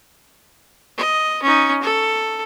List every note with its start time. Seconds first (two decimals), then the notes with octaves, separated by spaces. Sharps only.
0.97 D#5
1.42 C#4 D#4
1.82 A4